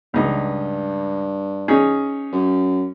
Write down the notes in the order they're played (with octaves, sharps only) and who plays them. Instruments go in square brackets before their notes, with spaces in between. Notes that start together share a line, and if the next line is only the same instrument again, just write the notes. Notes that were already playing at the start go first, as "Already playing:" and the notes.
[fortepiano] C#2 D#4 [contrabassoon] G2
[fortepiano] C#4 D#4 G#4
[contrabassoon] F#2